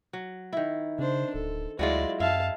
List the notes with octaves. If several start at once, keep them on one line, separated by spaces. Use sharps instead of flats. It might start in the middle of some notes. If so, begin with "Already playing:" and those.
F#3
D#3 E4
C#3 D4 C5
D1 A4
D2 F#3 G#3 E4 F4 D5
F#2 E4 F5 A5